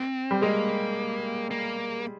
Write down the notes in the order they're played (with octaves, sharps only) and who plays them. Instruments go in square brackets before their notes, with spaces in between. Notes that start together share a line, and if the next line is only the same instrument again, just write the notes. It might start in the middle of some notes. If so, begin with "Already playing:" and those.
Already playing: [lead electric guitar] C4
[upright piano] G3
[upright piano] G#3 [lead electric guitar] A#3
[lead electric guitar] A#3